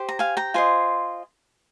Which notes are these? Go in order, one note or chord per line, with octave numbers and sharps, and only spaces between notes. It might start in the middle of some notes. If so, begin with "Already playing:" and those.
Already playing: G4 C5
A#5
F5 G#5
G5 A#5
F4 C5 D#5 G#5 C6